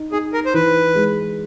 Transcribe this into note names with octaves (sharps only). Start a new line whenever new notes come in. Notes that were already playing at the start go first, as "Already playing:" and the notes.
Already playing: D#4
D#4 G#4
A#4
C5
E3 B4
G#3